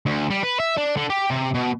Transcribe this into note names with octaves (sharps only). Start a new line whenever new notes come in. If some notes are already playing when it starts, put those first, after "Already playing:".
D2
G3
B4
E5
D4
D3
G4
C3
B2